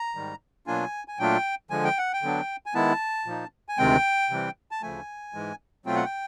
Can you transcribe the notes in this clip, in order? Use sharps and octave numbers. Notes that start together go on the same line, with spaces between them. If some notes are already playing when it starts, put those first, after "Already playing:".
Already playing: A#5
G#2 D#3 G3
B2 F#3 A#3 D4 F4 G#5
G#5
A#2 F#3 A3 D4 F4 G5
D3 F3 G#3 G#5
G5
F#5
G5
D3 F#3 B3 D4
G#5
D#3 G#3 B3 E4 A5
A#2 F3 A#3 D#4
G#5
D2 C3 D#3 G#3 C4 G5
C3 E3 G3 C4
A5
D2 C#3 F3 A3 G#5
G#2 E3 G#3
B2 F#3 A3 C4 F4 G5
F#5
G5